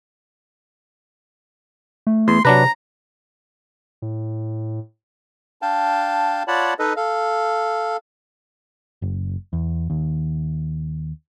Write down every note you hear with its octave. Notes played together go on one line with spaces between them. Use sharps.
A3
E2 C6
C3 F#3 D4 B4 A#5
A2
D4 F5 G5 A5
F4 C#5 D5 F#5 A5 B5
D#4 A4 B4 D#5
A4 F5
F#1
E2
D#2